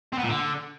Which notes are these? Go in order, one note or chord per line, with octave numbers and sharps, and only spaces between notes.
C4
B3
A#2
D3